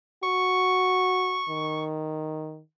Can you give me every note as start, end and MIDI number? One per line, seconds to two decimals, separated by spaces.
0.23 1.42 66
0.23 1.84 85
1.49 2.60 51